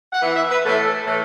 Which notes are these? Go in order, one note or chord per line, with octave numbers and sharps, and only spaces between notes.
F#5
E3 B3 E4 E5
E5
B4
A2 E3 A3 A4
A2 E3 A3